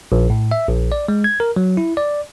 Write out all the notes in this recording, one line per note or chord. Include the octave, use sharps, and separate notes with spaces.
A#1
A2
E5
A#1
D5
G#3
G#6
A#4
F#3
E4
D5